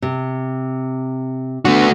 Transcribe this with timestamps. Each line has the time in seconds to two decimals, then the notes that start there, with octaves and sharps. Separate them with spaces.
0.02 C3
1.65 A3 B3 D4 F#4